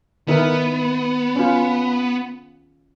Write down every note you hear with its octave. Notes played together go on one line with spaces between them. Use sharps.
D#3 B3 E4 A#4
C#4 F4